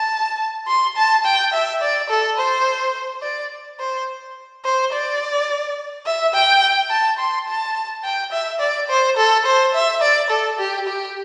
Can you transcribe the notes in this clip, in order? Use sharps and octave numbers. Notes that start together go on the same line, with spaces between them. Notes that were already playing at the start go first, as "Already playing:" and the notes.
Already playing: A5
C6
A5
G5
E5
D5
A4
C5
D5
C5
C5
D5
E5
G5
A5
C6
A5
G5
E5
D5
C5
A4
C5
E5
D5
A4
G4
G4